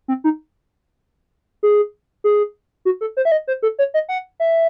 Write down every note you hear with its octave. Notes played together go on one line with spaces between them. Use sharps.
C4
D#4
G#4
G#4
F#4
A4
C5
E5
D#5
C5
A4
C#5
D#5
F#5
E5